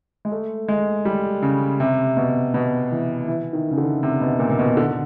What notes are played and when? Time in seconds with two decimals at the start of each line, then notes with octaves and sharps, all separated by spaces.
0.25 G#3
0.32 A3
0.68 G#3
1.05 G3
1.42 C#3
1.80 C3
2.17 B2
2.54 B2
2.92 E3
3.28 E3
3.53 D#3
3.71 C#3
3.78 D3
4.03 C3
4.21 B2
4.39 A#2
4.50 A#2
4.59 B2
4.77 D3